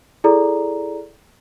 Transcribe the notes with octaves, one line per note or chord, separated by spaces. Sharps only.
E4 G#4 A4 D5 A#5